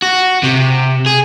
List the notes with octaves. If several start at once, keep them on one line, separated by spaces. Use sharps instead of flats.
F#4
C3
G#4